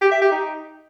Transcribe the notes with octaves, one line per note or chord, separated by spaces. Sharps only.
G4
E5
G4
D#4